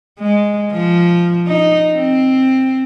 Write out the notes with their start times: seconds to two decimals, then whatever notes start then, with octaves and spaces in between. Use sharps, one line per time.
0.20 G#3
0.72 F3
1.48 D#4
1.95 C4